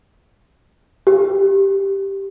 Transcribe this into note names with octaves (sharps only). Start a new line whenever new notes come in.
G4